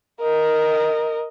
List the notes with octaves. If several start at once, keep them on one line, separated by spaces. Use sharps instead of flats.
A#4 D#5